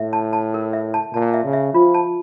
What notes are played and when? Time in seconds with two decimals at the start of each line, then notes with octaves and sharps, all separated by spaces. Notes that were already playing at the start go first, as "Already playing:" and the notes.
Already playing: A2 E5
0.13 A5
0.33 A5
0.54 A#4
0.73 E5
0.94 A5
1.13 A#2 A5
1.34 E5
1.44 C#3
1.53 E5
1.74 F3 F4
1.94 A5